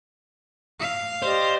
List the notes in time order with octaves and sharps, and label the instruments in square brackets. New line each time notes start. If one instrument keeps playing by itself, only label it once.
[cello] F5
[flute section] G4 D5 D#5 [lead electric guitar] C5